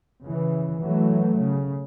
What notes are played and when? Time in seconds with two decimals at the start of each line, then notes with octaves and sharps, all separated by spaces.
0.23 C#3 E3
0.83 E3 F#3 A3
1.40 C#3